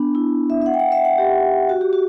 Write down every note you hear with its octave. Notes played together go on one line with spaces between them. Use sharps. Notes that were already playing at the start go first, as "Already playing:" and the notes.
Already playing: B3 D4
E4
E5
E5
F#5
G5
F#5
E5
F#5
G4
F#4
G4
F#4